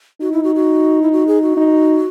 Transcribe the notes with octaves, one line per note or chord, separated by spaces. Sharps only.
D#4 F#4
E4
F#4
F#4
E4
F#4
G#4
F#4
D#4